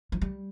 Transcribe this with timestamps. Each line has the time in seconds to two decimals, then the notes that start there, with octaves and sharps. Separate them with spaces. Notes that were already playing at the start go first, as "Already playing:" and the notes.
0.12 F3
0.22 G3